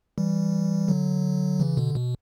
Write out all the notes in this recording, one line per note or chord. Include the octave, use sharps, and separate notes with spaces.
E3 G3
D3 F#3
C#3 E3
B2 D3
B2